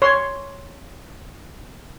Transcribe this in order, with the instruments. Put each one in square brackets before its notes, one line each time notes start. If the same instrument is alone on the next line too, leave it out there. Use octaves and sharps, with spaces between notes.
[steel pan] C#5 C6